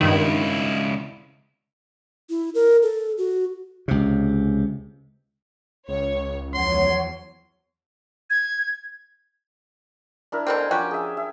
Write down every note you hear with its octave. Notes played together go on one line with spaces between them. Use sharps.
C#2 G2 D#3 E4
E4
A#4
A4
F#4
C#2 C3
C#2 C#5
E2 F3 F#3 C#5 F#5 C6
G#6
D4 E4 A#4
B2 A#3 C4 A4 A#4 D5
G#5
F3 C#4 F#4 G4 G#5
G#4 E5
E5